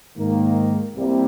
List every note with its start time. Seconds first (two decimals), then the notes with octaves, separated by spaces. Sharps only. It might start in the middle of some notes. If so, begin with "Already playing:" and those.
0.18 G#2 D#3 A#3
0.96 C2 C3 G3 A#3